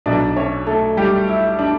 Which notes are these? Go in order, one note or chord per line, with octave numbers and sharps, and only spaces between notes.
B1 B2 D4 D5
C#4 C#5
A3 A4
G3 G4
E4
D4